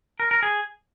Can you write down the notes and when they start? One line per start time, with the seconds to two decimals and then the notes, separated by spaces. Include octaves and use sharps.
0.20 A#4
0.31 A#4
0.43 G#4